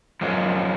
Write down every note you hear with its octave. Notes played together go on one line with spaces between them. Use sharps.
F#2 F3 G#3